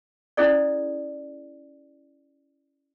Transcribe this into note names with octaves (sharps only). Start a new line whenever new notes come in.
C#4 E4 G#4 A4 D5